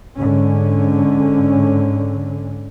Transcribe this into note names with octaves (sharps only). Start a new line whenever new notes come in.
G#2 D3 C#4